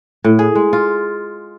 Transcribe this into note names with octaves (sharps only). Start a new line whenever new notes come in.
A2
G#4
G#3
F4